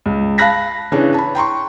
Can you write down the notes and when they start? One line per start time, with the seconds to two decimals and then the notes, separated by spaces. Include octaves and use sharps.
0.06 C#2
0.38 F5 A5 B5 F#6 A#6 B6
0.92 C#3 E3 C#4 D4
1.14 A5 B5
1.35 G5 A#5 C6 C#6